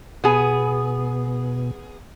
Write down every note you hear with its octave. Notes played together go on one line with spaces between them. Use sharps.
B2 B3 G#4